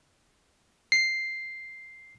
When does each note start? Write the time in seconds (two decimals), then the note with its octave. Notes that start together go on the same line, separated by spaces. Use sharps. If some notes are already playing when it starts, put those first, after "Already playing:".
0.92 C7